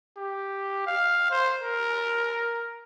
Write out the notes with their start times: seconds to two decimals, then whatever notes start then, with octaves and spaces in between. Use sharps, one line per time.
0.17 G4
0.86 F5
1.30 C5
1.61 A#4